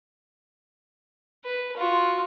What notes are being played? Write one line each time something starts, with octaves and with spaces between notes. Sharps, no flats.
B4
F4 F#4